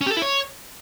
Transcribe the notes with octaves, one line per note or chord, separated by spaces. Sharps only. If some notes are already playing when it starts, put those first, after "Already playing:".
C#4
G4
A4
E4
C#5